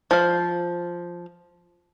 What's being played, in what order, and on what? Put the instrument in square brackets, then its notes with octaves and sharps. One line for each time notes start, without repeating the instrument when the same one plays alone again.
[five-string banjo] F3 F5